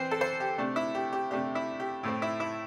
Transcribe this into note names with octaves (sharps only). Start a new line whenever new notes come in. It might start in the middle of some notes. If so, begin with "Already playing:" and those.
Already playing: E3 C4 C5
A4
C5
G4
C3 A3 D4
E4
G4
G4
C3 A3 D4 G4
E4
G4
A2 A3 C4
E4
E4